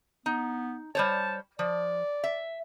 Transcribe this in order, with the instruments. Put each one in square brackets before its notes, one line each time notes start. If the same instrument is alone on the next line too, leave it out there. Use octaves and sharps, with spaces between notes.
[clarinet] B3 [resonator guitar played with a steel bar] D#4
[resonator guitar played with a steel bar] G3 C5 C#5 [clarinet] A5
[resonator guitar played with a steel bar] F3 [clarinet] D5
[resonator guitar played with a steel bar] E5